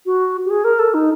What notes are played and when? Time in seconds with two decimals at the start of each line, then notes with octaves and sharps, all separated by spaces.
0.06 F#4
0.46 G4
0.50 G#4
0.65 A#4
0.79 A4
0.94 D#4